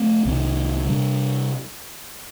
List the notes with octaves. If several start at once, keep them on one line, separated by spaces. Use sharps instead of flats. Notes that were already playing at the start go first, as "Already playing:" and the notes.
Already playing: A3 C4
C2 C3 D#3
C3 G3 D4